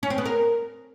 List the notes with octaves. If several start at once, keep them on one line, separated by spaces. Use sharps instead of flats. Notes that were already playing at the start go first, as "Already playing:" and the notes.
C#4
C4
B3
A#4